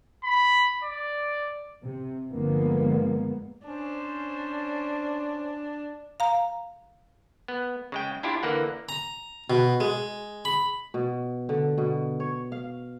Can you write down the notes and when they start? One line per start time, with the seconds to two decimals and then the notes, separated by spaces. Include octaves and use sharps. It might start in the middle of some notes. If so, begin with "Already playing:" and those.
0.24 B5
0.84 D5
1.83 C3
2.31 G1 D3 F3 G#3 A#3 B3
3.66 C#4 D4 C5
6.20 F5 A#5
7.48 B3
7.92 C#3 G#3 G5
8.23 D4 E4 F4 G4
8.43 D3 E3 A#3 F#5
8.89 A#5
9.50 B2
9.80 G#3
10.45 B5
10.94 B2
11.49 D3
11.78 B2
12.20 C#5
12.52 F5